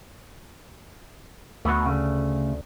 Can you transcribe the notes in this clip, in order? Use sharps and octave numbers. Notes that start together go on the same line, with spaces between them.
D2 A3 B3 F#4
C#3 A3